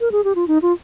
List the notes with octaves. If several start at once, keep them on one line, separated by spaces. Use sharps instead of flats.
A#4
G#4
G4
F4
D#4
F4